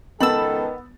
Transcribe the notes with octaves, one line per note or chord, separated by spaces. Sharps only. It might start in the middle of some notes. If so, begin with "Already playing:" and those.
C#2 D#3 B3 A4 B5 E6 A6